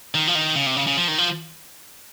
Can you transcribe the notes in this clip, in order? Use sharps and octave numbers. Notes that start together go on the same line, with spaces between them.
D#3
F3
D#3
C#3
C3
C#3
C#3
F3
D#3
F3